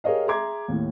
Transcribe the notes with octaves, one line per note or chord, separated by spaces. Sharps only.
G4 G#4 A#4 C#5 D#5 F5
G#4 E5 A#5 C6 D6 G#6
D#2 A2